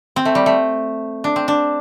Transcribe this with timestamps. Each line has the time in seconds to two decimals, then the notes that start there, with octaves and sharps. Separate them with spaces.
0.16 C4
0.25 A3
0.35 G3
0.46 A3
1.24 D4
1.36 C4
1.48 D4